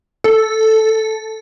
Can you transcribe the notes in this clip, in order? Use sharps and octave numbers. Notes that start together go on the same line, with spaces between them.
A4